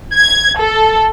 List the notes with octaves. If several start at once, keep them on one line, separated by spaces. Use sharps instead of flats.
G#6
A4